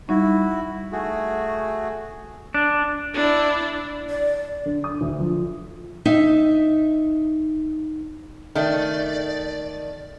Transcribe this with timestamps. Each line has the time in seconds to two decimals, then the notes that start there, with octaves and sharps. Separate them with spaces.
0.09 G3 D#4 E4 F#4
0.92 A3 F#4 G#4
2.54 D4
3.14 D4 E4
4.09 D5
4.66 D3
4.84 D#6
5.01 D2
5.19 F3
6.05 D#4 E5
8.55 D#3 A3 D5